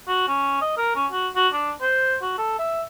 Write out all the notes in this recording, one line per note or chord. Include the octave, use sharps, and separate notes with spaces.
F#4
C#4
D#5
A#4
C#4
F#4
F#4
D4
C5
F#4
A4
E5